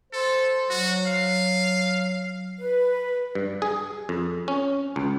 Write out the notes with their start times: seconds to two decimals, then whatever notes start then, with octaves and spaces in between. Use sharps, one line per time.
0.13 A4 C5
0.70 F#3 F#4
1.07 F5
2.59 B4
3.35 G2
3.62 G#4
4.09 F2
4.48 C#4
4.96 C#2